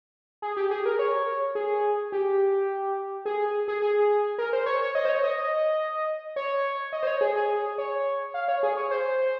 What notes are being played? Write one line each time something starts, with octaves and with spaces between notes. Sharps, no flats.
G#4
G4
G#4
A#4
C#5
G#4
G4
G#4
G#4
G#4
A#4
C5
C#5
C#5
D#5
C5
C#5
D#5
C#5
D#5
C5
C#5
G#4
G#4
C#5
F5
C#5
G#4
C#5
C5